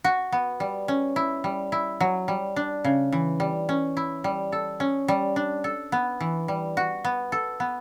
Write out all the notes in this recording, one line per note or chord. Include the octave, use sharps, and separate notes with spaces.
F#4
B3
G3
C#4
E4
G3
E4
F#3
G3
D4
C#3
E3
G3
C#4
E4
G3
A4
C#4
G3
D4
A4
B3
E3
G3
F#4
B3
A4
B3